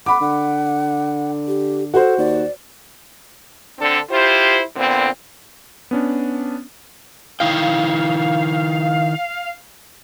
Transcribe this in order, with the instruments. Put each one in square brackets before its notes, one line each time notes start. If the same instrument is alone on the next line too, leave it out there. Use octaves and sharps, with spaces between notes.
[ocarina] F#5 [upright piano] B5 D6
[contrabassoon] D3 [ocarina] F#5
[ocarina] G4
[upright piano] F#4 C5 [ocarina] A4
[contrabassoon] D#2 [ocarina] D5
[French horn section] D3 C4 D4 A4
E4 F4 G4 C5
A#2 D3 B3 C4
[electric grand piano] B3 C#4 D4
[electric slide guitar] D#3 E4 G5 [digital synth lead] F5